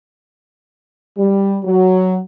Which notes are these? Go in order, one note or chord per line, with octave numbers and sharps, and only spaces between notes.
G3
F#3